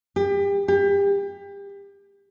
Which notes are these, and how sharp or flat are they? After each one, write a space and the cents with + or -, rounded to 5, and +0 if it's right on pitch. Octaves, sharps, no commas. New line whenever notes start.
G4 +30
G4 +30